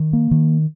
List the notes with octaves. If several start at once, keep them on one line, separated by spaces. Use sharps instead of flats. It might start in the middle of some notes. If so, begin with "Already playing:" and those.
Already playing: D#3
A#3
D#3